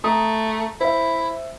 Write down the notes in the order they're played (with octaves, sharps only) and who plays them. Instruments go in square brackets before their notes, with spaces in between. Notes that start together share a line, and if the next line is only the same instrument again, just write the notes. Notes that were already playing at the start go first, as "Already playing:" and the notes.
[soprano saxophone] A3 [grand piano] A#5 D#6
[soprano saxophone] E4 [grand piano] C5 E5